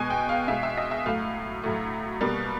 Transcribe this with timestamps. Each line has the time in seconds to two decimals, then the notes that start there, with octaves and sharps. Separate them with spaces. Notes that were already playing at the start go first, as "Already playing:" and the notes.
Already playing: B2 G#3 G#5
0.10 G5
0.29 F5
0.48 B2 G#3 E5
0.63 E5
0.77 D#5
0.91 E5
1.06 A2 F#3 A3 F5
1.64 A2 F#3 A3
2.21 B2 G3 A#3